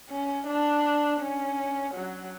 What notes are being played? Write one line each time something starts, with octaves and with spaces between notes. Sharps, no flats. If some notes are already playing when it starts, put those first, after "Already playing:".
C#4
D4
C#4
F#3